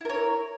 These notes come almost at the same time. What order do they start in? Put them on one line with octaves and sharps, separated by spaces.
E4 A#4 C#5